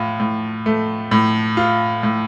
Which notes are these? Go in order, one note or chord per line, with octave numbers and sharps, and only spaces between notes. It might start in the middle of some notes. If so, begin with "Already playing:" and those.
Already playing: A2 F4
A2
A3
A2
F4
A2